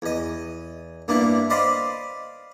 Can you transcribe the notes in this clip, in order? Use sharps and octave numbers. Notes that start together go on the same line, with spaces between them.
E2 D#5
G2 A#3 B3 D4 E4
C5 D5 D#5 F5 B5 C6